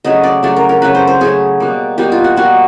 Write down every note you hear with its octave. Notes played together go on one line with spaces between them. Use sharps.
C#3 F#3 A3 D#5
D5
C#3 F#3 A3 D5
A#4
A#4
C#3 F#3 A3 B4
C5
C5
C#3 F#3 A3 G#4
B2 G3 A#3
B2 G3 A#3 G4
F4
F#4
B2 G3 A#3 F#4